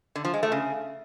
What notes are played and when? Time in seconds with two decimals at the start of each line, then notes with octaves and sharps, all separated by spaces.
0.16 D3
0.25 F3
0.34 G#3
0.43 A3
0.52 C#3